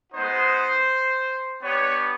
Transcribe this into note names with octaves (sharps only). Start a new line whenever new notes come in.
G#3 B3 D#4 F#4 C5
B3 D4 G4 C#5